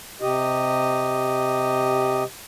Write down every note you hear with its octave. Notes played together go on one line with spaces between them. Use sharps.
C3 G4 D#5